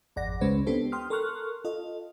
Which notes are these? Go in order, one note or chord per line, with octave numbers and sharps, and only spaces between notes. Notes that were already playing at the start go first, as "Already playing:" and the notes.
G#1 F2 D5 F#5 A#6
C#2 C#3 G#3 C#4 B4 C5
B3 C4 D4 G4 A4 C5
G5 C6 D#6 F6
A4 A#4 C6 C#6 F6 F#6
F4 A4 D#5